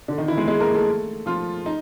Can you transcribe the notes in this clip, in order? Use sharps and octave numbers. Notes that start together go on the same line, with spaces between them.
D3 D4
D#3 D#4
E3 E4
G#3 G#4
G#3 G#4
A#3 A#4
A3 A4
F3 F4
D#4